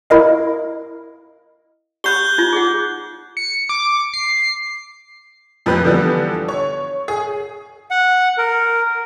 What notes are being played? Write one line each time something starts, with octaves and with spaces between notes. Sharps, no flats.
E4 A#4 D#5 F5
G4 F#5 B5 F#6 G6 G7
D#4 F4
G#4 F#5
C#7
D6
C7
F2 F3 G4 B4 F#6 G6
D3 E3 F3 G3 B3
C#5
G#4
F#5
A#4